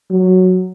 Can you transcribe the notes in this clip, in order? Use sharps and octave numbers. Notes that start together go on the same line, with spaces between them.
F#3